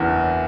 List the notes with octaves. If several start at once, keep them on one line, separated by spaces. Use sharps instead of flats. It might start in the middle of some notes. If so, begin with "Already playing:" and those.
Already playing: F#1 E2